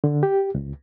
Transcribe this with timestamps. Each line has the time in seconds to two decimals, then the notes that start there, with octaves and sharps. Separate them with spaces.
0.04 D3
0.23 G4
0.55 C#2